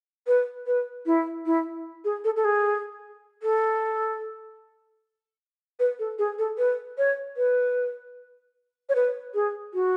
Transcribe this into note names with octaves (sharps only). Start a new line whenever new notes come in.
B4
B4
E4
E4
G#4
A4
A4
G#4
A4
B4
A4
G#4
A4
B4
C#5
B4
C#5
B4
G#4
F#4